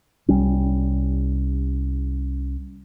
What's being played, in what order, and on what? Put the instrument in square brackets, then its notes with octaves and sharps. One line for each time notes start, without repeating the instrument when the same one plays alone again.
[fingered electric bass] C2 G3 C#4